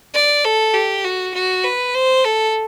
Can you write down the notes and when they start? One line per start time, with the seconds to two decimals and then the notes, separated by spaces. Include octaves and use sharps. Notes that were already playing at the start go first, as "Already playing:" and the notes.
0.14 D5
0.45 A4
0.74 G4
1.05 F#4
1.34 F#4
1.64 B4
1.94 C5
2.24 A4